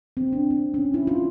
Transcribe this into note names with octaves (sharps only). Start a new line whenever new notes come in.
C4
D4
C4
C#4
E4
F4